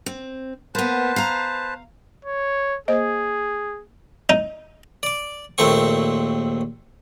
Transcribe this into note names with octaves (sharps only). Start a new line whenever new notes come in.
C4
A#3 B3 B4 C5 A5
F5 A#5
C#5
A#3 G#4 C5 D#5
D#4
D5 D6
A#1 D#2 A3 C4 C#6